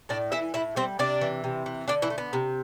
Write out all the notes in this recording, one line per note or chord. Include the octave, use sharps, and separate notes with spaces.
A2 D4 D5
E3 E4 E5
A2 E4 E5
G3 C4 C5
C3 D4 D5
E3
C3
E3
D3 D4 D5
E3 E4
A3
B3
C3